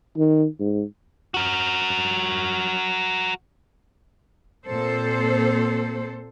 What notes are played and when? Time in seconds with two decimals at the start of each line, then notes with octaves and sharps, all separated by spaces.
0.17 D#3
0.60 G#2
1.34 F#4 A#4
4.66 A#2 C4 A4 C5